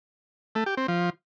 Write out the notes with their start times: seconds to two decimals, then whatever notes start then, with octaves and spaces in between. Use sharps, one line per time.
0.55 A3
0.66 G4
0.77 C4
0.88 F3